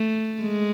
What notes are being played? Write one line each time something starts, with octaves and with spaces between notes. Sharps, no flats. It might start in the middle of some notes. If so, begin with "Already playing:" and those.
Already playing: A3
G#3